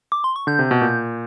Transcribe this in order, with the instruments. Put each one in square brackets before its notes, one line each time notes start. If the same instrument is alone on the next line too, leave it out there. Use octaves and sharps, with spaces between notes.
[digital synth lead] D6
C6
C#6
[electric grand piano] D3 [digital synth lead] G6
[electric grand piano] C3
B2
A#2